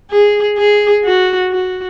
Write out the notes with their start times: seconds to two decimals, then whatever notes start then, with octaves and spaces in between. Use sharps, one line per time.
0.11 G#4
0.58 G#4
1.05 F#4
1.51 F#4